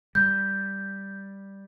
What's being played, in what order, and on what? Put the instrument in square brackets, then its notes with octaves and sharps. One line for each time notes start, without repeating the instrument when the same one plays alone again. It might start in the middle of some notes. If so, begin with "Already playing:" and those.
[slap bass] G3 [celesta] G6